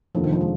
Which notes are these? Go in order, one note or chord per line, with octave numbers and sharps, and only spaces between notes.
F1 D#2 D3 F3
D#3
F3
G#3